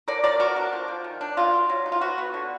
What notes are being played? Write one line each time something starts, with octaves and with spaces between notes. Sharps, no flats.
D3 A#4 D5
D3 A#4 D5
B3 F#4 A#4
D4
F3
F3
D#3
D4
B2 F4
B2
F#3
D#4
F4
B3 F#4
B3
D3